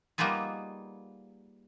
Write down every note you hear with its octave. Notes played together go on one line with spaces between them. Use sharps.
G3 A#3 B3 D#4 F4 G#4